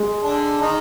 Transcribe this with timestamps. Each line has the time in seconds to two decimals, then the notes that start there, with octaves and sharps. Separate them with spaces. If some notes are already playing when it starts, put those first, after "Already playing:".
Already playing: G#3
0.23 D3 D4
0.61 D#3 D#4